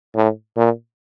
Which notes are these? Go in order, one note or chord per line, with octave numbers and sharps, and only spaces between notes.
A2
A#2